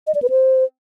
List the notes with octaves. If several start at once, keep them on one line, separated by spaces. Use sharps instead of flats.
D#5
D5
B4
C5